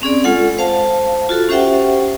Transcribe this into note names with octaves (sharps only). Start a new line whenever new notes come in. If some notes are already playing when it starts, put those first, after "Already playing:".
C4 C#4 G#4 D5
G#3 F4 A4 F#5
C5 F5 A5
F4 F#4 A4
C#4 G4 C5 E5 F#5 G5